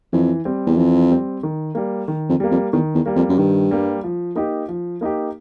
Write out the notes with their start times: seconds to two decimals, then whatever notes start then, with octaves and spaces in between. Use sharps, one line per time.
0.13 F2 E3
0.45 G3 C4
0.66 E2
0.77 F2 E3
1.10 G3 C4
1.43 D#3
1.75 G3 A#3
2.08 D#3
2.29 F2
2.40 G3 A#3
2.51 F2
2.73 E2 D#3
2.94 E2
3.06 G3 A#3
3.16 F2
3.29 F#2
3.38 G2 D#3
3.71 G3 A#3
4.04 F3
4.35 A#3 D#4 G4
4.68 F3
5.01 A#3 D#4 G4